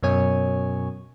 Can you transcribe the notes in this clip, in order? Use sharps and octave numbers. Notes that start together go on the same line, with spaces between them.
F#2 B2 C#5 G#5